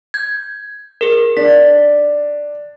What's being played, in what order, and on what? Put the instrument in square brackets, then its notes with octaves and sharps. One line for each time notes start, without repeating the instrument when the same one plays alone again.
[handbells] G6 G#6
G#4 A#4
[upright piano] D4 [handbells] B6